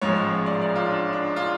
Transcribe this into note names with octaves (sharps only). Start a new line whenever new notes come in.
A1 G#2 F3 G#3 C#5
D5
D5
F4
D4
D4
F4